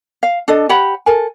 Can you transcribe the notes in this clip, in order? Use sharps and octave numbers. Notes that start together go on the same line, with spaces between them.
F5
D4 A4 D#5
G4 C#5 F#5 B5
A4 A#4 G#5